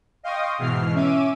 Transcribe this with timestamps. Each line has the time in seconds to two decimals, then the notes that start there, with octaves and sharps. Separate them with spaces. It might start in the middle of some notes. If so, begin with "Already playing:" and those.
0.23 D#5 F5 G5 C6 C#6 D#6
0.58 G#2 B2 E3 F6 C7
0.94 C#4 E5 D6 D#7